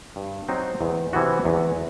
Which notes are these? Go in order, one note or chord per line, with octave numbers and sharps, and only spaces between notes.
G2
F#3 C4 D#4
E2
C3 E3 B3 F#4
E2